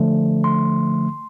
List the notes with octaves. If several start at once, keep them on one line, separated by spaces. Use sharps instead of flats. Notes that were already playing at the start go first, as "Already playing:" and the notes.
Already playing: D3 F3 A3
C6